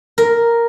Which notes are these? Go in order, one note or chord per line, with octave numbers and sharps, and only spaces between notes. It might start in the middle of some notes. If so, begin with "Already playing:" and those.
A#4